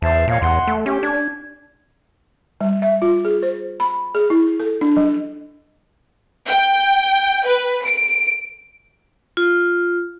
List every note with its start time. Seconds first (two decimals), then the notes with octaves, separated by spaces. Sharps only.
0.02 E2 C5 E5 A5
0.28 A#2 C#5 D#5 F5
0.42 E2 F#5 C6
0.67 A3
0.86 C#4 G4
1.03 D4 G#6
2.61 G3
2.82 E5
3.02 F4
3.25 G#4
3.43 C5
3.80 B5
4.15 G#4
4.30 E4
4.60 A4
4.81 D4
4.97 F#3
6.47 G5
7.46 B4
7.86 D7
9.37 F4